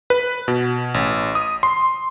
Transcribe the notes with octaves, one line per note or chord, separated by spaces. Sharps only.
B4
B2
A1
D#6
C6